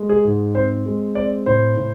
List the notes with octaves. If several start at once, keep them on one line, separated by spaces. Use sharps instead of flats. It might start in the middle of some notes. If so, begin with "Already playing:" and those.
Already playing: G#3
G#4
G#2
C4 C5
G#3
C4 D5
A2 C5
A2